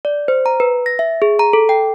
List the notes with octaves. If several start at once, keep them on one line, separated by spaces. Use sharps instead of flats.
D5
C5
A#5
B4
A#6
E5
G#4
A#5
A4
G5